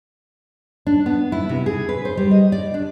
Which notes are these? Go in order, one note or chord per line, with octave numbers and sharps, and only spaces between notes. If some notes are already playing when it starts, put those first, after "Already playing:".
D4
B3
E4
C3
G#4
B4
C5
G3
D#5
D5
D4